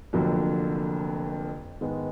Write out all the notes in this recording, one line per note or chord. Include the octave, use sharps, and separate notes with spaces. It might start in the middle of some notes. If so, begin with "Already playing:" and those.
F1 F2 D3 F#3 A#3
G#2 D#3 G#3 B3